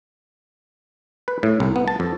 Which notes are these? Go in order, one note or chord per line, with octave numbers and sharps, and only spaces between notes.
B4
A2
C2
B3
A5
F2